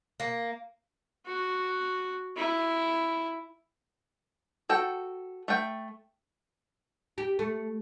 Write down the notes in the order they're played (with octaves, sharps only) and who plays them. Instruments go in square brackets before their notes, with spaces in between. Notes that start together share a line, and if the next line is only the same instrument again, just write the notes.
[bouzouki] A#3
[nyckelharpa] F#4
E4
[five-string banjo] F#4 A4 G5
A3 G5
[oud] G4
A3